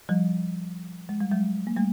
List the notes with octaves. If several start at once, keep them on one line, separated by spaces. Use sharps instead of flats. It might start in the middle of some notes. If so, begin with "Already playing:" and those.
F3 G3
G#3
G3
F#3 G#3
A#3
G3 A3